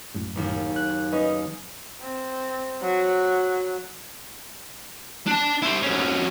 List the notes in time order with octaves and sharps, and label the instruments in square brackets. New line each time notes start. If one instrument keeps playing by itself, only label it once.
[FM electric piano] A#1 F#2 A2
[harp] F#1 D#2
[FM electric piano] F#6
[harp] C#4 D#4 [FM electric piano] B4 D#5
[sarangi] C4
F#3
[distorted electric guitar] D4 A5
E4 C5
F2 C#4